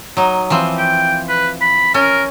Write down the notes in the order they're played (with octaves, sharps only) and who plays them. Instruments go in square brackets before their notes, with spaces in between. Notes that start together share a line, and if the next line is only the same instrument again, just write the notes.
[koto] F#3 D#4
E3 F3 C4
[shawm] G5
B4
B5
[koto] C#4 [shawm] A#4